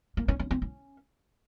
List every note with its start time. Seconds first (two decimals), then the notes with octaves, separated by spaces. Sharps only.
0.17 A#3
0.28 C#4
0.39 C#4
0.51 C4
0.62 C#4